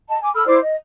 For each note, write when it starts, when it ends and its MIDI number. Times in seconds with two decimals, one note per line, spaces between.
0.08 0.17 75
0.08 0.17 81
0.21 0.29 80
0.21 0.29 86
0.34 0.44 69
0.34 0.44 83
0.34 0.44 88
0.34 0.44 89
0.46 0.57 64
0.46 0.57 72
0.46 0.57 74
0.46 0.57 86
0.61 0.75 75